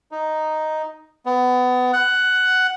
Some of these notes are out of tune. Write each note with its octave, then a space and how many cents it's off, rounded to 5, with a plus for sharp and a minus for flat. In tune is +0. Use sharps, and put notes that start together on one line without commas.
D#4 +0
B3 +25
F#5 +10